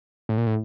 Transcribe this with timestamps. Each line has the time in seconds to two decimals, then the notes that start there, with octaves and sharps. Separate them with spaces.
0.29 A2
0.38 A#2
0.47 A2